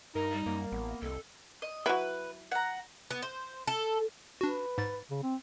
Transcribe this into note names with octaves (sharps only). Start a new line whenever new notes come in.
G2 D#4 A#4
G3
F#2 A#3
A1 B3
C2 F2 A4
D#5
F#3 E4 B4
F#5 A#5
B3
C5
A4
D4 F#4 B4
G#2 A6
C#3
C4